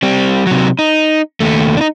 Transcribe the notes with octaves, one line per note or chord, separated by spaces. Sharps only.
G3 C4
C3 F#3
D#4
D#2 A3
D4 D#4